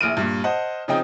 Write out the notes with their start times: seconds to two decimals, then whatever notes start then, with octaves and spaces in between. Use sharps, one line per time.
0.01 A#1 E4 F6 D7 D#7
0.17 G2 A#2
0.44 C5 D#5 F#5 A5
0.88 C#3 F3 C4 D#4 G5 D#6